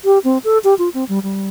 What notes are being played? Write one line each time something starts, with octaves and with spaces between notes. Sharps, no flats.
G4
C4
A4
G4
F4
C4
G3
G3